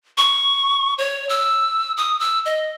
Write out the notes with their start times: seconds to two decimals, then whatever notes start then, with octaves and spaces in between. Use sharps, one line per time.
0.18 C#6
0.98 C#5
1.29 E6
1.97 D#6
2.20 E6
2.46 D#5